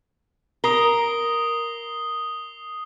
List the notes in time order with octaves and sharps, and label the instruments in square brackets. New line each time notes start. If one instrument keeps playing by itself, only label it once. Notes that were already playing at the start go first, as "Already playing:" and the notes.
[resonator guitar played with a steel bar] A#4 [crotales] D#6 C7 G7